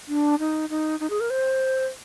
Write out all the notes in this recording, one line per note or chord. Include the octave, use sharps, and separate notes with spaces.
D4
D#4
D#4
D#4
G#4
A#4
C5